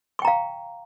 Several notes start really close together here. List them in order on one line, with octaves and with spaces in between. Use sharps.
C#6 G5 A#5 F5